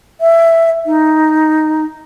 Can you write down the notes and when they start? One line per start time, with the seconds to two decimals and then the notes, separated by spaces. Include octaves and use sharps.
0.21 E5
0.86 D#4